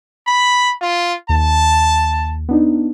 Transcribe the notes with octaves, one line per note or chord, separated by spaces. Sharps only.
B5
F4
D#2 A5
B3 D4 D#4